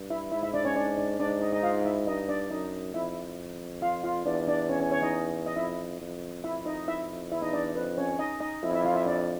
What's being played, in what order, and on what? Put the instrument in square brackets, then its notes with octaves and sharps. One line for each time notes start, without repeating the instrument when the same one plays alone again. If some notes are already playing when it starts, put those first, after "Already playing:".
Already playing: [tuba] G2
[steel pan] E4 E5
[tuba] G#2 [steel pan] E4 E5
[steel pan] E4 E5
D4 D5
C#4 C#5
D4 D5
D4 D5
[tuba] G#2 [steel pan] D4 D5
[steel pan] D#4 D#5
D#4 D#5
F4 F5
E4 E5
[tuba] G2 [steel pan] D#4 D#5
[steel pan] D4 D5
[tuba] F#2 [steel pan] D#4 D#5
[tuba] F2 [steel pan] E4 E5
[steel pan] F4 F5
F4 F5
[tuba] E2 [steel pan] D4 D5
[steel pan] D4 D5
C#4 C#5
C#4 C#5
C#4 C#5
D#4 D#5
D#5
[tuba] F2 [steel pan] E4 E5
[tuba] F2
[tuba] F2 [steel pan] E4 E5
[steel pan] D#4 D#5
E4 E5
[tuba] E2 [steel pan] E4 E5
[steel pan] D#4 D#5
D4 D5
[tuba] F2 [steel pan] B4
[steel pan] C#4 C#5
D#4 D#5
D#4 D#5
[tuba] F2 [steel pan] E4 E5
[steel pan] E4 E5
F4 F5
E4 E5
D4 D5